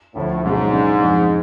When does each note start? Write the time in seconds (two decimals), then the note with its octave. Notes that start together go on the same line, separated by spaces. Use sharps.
0.15 D2 A2 D3 F3
0.44 G#2 B2 F#3 C#4 G#4
0.72 C#3 G#3 D4
1.01 F2 F3 G#3